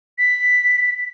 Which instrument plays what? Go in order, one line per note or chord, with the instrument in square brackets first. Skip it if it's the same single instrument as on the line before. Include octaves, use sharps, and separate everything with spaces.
[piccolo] B6